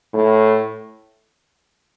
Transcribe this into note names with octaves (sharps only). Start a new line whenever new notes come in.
A2